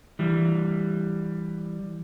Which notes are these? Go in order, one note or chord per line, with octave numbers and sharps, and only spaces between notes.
E3 G3